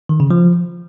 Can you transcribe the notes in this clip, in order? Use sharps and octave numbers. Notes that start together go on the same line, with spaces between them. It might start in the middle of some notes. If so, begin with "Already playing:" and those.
D#3
C#3
F3